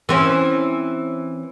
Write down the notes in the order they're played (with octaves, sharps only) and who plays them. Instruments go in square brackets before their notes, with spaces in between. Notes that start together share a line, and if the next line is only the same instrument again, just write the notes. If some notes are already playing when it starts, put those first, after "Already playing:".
[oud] E3 C4 C#4